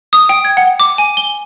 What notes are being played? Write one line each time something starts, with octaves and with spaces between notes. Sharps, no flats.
D#6
G5
G#6
F#5
D6
G#5
G7